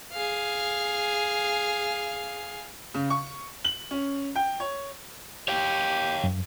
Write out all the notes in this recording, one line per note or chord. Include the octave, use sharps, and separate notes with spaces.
G#4 F5
C#3
C#6
F#7
C#4
G5
C#5
G4 C#5 F5 G5
F#2